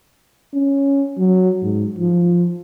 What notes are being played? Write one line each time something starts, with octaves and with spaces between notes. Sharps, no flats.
C#4
F#3
G#2
F3